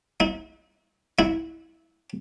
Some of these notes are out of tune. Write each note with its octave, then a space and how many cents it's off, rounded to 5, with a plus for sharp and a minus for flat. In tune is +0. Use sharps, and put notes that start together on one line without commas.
E4 -45
E4 -15